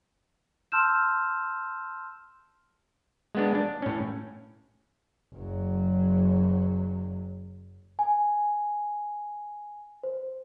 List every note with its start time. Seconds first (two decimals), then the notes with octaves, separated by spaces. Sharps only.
0.72 A5 C6 E6 F6 G6 E7
3.35 G#3 B3 D4
3.55 D4
3.82 A2 C#4
5.35 F#1 F#3
7.99 G#5
10.03 C5